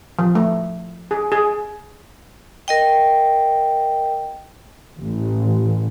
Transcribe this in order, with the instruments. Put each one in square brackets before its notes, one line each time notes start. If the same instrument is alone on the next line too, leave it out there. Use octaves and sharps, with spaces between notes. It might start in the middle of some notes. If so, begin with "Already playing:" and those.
[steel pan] F3
A3
G#4
G#4
[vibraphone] A#4 D#5 G5
[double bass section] A1